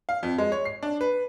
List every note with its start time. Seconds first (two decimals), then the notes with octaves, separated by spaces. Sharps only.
0.09 F5
0.23 F2
0.38 G#3
0.52 C#5
0.65 C7
0.83 D4
1.01 B4